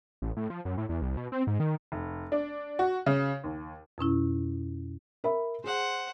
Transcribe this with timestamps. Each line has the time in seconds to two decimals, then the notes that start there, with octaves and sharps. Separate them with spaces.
0.22 A1
0.37 A2
0.50 F3
0.65 F#2
0.78 A2
0.89 E2
1.02 C2
1.17 B2
1.32 C4
1.47 G#2
1.60 D#3
1.92 F1
2.32 D4
2.79 F#4
3.06 C#3
3.44 D#2
3.98 F2 B2 C#4 E4
5.24 A#4 E5 B5
5.64 G#4 C5 F#5